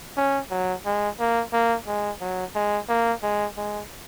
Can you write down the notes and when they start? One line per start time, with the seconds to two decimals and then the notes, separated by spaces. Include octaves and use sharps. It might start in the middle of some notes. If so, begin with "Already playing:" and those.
0.17 C#4
0.51 F#3
0.86 G#3
1.19 A#3
1.53 A#3
1.87 G#3
2.21 F#3
2.55 G#3
2.89 A#3
3.23 G#3
3.57 G#3